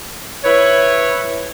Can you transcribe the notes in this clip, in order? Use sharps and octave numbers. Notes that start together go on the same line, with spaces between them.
E4 B4 C#5